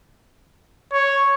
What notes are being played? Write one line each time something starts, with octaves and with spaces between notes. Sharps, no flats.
C#5